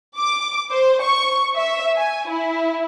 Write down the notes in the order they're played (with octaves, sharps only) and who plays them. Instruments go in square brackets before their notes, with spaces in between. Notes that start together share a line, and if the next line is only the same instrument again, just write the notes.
[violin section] D6
C5
C#6
E5
G#5
E4